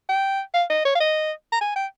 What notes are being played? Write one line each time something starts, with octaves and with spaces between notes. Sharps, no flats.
G5
F5
D#5
C#5
F5
D#5
A#5
G#5
G5